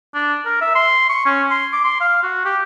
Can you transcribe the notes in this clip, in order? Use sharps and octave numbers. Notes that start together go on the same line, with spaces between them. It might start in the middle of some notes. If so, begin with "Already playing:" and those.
D4
A#4
E5
C6
C#6
C#4
C6
D6
C6
F5
F#4
G4